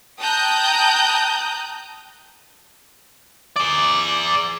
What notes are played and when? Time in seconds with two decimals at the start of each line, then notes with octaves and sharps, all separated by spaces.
0.19 G5 A5 A#5 D#6 F#6 G6
3.56 G#4 D5